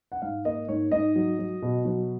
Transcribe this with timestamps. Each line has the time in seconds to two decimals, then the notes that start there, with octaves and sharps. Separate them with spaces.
0.12 F#5
0.22 G#2 F5
0.45 A#3 D#5
0.68 G#2 C#5
0.91 G#2 D#5
1.16 F#3
1.39 F#3
1.62 B2
1.85 F#3